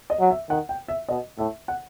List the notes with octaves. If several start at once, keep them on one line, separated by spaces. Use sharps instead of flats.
D#5
F#3
E5
D#3 F#5
G5
E5
B2 D#5
A2 E5
F#5